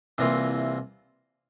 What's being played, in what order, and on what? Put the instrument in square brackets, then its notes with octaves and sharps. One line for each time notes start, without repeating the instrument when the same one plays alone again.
[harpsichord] C2 C3 E3 A#3 F4